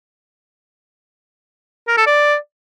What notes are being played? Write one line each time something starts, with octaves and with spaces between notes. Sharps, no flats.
A#4
A4
D5